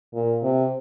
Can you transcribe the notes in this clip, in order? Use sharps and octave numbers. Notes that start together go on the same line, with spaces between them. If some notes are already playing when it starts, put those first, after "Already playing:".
A#2
C3